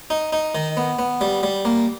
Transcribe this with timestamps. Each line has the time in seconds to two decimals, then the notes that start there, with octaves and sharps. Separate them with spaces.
0.10 D#4
0.33 D#4
0.55 D#3
0.77 B3
0.99 B3
1.21 G3
1.43 G3
1.65 A#3